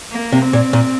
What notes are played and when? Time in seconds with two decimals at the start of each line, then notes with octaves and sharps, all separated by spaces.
0.11 A#3
0.32 C3
0.42 C4
0.53 A#2
0.73 A#2